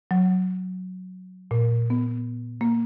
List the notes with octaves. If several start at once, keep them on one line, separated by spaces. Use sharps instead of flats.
F#3
A#2
B3
A#3